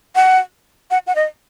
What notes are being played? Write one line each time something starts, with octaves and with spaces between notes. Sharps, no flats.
F#5
F#5
F#5
D#5